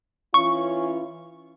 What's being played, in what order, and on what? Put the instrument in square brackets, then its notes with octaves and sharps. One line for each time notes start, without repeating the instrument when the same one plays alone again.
[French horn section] E3 C#4 F4 [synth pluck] C#6